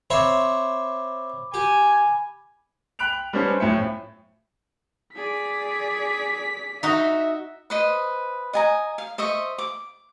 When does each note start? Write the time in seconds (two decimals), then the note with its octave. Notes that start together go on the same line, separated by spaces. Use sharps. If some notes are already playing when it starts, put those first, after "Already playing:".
0.10 C4 C#5 E5 B5 D6
1.54 G4 G#5
2.99 G5 B5 F#6 D7 F7
3.33 G3 B3 C#4 D4 C5 C#5
3.60 F#2 A2 F3 E5 G5 C#7
5.15 G#4 D5 B6
6.83 D#4 F#4 E5
7.70 B4 C5 D#5
8.53 D#5 G#5 A#5
8.98 F5
9.18 C5 D#5 E5 C#6
9.58 D6